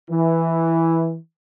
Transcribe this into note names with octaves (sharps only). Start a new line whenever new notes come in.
E3